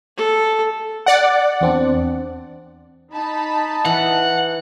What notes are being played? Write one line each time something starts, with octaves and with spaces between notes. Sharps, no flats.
A4
D5 F#5
E2 C4 D4
D#4 A5 B5
E3 F#5